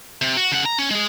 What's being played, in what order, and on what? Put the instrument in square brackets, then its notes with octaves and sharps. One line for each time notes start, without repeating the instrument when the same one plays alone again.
[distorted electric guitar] C3
F#4
C#3 F#5
A#5
C#4
G#3 G#4